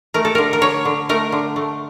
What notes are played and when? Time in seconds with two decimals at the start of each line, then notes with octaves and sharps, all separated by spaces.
0.14 A3 A#4
0.25 A4
0.35 D3 A#4
0.53 A#4
0.61 D3 C#5
0.85 D3
1.09 A3 A#4
1.32 D3
1.56 A3